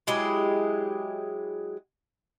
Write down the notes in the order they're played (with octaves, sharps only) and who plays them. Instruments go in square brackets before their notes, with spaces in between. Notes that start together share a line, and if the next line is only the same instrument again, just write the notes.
[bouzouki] F#3 G#3 E4 G4